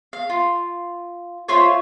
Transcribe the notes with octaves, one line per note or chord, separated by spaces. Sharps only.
F5
F4
A3 F4 C5 C#5